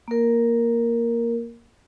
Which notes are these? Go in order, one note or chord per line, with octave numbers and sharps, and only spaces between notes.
A#3 A#4